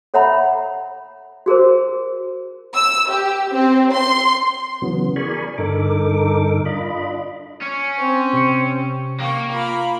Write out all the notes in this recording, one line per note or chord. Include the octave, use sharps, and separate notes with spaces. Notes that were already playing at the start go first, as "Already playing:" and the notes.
A4 C#5 E5 F#5 A#5 B5
F#4 G#4 A#4 C5
E6
G4
C4
C6
C#3 E3 F#3 B3
G#4 A#4 D5 G#5 B5 C#6
G2 D3 D#4 A4 A#4 D6
D4 F4 D#5 B5
C#4
C4
C3 C#7
A#3 G5 C#6
F4 A#4 B5